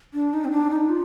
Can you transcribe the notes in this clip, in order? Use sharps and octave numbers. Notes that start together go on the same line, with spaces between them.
D4
D#4
C4
D4
D#4
F4